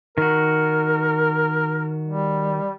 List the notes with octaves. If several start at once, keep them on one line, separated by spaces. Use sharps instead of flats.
D#3 F#4 A#4
G3